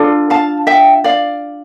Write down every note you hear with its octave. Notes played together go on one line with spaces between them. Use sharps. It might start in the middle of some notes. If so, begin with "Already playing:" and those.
Already playing: D4 F4 A4
F5 A5
E5 G5
D5 F5